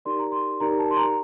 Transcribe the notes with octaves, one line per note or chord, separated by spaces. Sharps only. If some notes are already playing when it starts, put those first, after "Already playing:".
D#4 G4 A#4 D5 C6
A#5
C6
D#4 G4 A#4 D5 A#5
A5
C6
A#5